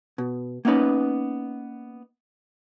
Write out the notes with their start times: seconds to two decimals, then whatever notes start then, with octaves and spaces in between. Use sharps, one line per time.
0.18 B2
0.65 A#3 B3 C#4 D#4 B4